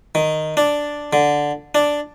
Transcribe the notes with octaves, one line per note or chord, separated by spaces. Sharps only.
D#3
D4
D3
D4